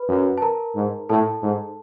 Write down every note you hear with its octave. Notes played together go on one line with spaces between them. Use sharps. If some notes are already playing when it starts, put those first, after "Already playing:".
Already playing: B4 B5
F#2
A5
A#4 A#5
G#2
A2 A4 A5
G#2